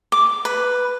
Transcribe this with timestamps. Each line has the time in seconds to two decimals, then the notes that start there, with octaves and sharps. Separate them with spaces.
0.12 D6
0.45 B4